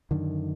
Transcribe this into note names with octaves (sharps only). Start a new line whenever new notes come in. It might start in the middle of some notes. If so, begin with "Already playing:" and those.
F#2 D3 D#3